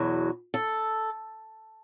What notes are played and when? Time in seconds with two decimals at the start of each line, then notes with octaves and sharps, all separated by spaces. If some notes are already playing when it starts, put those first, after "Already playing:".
Already playing: E2 B2 F#3
0.54 A4